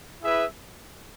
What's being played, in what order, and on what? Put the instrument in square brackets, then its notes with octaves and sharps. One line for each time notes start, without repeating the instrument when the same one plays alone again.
[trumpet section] E4 G#4 B4 E5